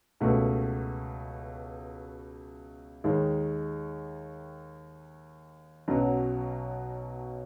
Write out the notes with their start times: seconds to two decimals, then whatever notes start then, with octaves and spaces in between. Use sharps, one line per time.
0.21 C#2 B2 A3
3.04 D#2 D#3 G#3
5.88 B1 B2 F#3 C#4